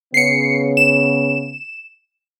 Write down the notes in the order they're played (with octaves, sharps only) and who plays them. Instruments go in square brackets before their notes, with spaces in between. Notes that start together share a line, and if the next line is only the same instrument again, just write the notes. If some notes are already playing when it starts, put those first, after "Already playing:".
[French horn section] C#3 B3 [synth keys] C7 C#7
[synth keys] E7